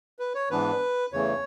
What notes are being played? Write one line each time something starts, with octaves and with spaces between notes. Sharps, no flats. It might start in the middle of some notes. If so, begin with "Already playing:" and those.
B4
C#5
G#2 E3 B3 D4 B4
E2 C#3 E3 A3 C#5